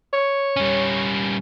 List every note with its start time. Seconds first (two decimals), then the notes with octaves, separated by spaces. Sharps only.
0.13 C#5
0.56 G3 C#4